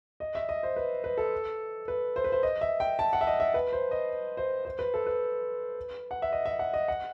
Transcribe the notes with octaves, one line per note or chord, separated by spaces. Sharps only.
D#5
E5
D#5
C5
B4
B4
A4
B4
C5
B4
C5
D#5
E5
G5
A5
F#5
E5
D#5
E5
B4
C5
D#5
C5
C5
B4
A4
B4
F#5
E5
D#5
E5
F#5
D#5
F#5